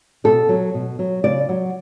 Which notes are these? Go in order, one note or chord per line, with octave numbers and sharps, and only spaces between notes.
B2 A4
F#3
B2
F#3
C#3 D5
F#3